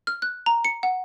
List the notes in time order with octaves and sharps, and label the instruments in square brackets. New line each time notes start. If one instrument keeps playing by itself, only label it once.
[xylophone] F6
F#6
A#5
C#7
F#5